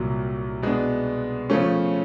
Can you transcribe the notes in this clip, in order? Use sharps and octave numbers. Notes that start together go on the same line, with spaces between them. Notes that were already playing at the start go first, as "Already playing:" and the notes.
Already playing: C2 A#2 F#3
B2 G#3 B3 D4
C#3 F3 A3 C#4